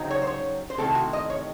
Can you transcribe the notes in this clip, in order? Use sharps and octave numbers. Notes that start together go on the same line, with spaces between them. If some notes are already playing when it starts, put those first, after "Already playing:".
Already playing: C#3 F#3 C4 D#4
C#5
C5
C#5
C5
C3 D#3 A3 C4 E4 A4
F#4
D#5
C#5